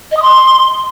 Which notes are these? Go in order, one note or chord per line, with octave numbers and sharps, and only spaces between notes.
D#5
D#6
C6